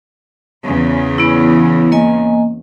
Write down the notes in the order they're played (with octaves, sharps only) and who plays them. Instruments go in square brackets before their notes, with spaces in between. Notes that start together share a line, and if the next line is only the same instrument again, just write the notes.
[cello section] E2 C#3
[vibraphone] B3 E4
A#3 D#5 G#5